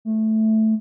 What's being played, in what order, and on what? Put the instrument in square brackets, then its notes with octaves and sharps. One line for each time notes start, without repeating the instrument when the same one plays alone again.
[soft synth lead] A3